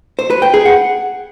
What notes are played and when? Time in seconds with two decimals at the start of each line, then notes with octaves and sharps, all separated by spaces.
0.19 C5
0.30 B4
0.42 G5
0.54 G#4
0.65 F#5